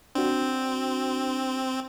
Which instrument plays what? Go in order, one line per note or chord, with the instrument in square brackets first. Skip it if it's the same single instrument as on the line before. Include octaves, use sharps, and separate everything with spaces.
[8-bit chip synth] C4 [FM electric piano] D4 F#4